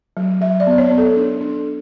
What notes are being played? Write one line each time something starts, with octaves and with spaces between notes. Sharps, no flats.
F#3
F#3 E5
D5
B3
C#5
B3
A4
D4
D4